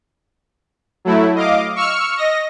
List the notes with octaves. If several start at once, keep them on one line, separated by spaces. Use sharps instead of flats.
F#3 A3 E4
D#5 F5 D6
C#6 E6 F6 C#7
D#5 A#6